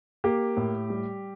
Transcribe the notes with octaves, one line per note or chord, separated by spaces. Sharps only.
A#3 G4
A2
G3